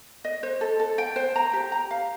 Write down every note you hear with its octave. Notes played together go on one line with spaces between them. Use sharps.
D#5
C5
A4
A4
G5
C5
A#5
G4
A#5
F5